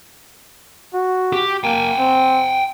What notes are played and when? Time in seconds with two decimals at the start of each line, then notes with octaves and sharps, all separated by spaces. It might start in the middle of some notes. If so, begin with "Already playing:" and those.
0.94 F#4
1.33 G4
1.64 A#3 G5 G#5
1.98 C4